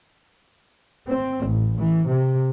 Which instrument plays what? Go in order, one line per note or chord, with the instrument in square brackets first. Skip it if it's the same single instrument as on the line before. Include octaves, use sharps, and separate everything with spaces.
[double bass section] C4
A1
E3
C3